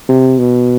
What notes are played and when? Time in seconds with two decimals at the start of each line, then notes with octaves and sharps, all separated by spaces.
0.09 C3
0.38 B2